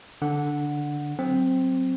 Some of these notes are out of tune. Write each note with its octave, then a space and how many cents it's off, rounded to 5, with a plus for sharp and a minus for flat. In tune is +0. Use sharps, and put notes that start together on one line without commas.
D3 +0 D4 +0 F#5 -10
F#3 +0 C4 +0